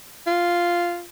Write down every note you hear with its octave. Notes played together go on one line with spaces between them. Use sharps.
F4